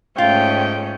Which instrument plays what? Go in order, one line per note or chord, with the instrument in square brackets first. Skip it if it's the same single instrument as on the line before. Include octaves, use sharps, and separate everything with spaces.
[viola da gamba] G#2 C#4 [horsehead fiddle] A3 C#5 [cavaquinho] F4 [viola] G5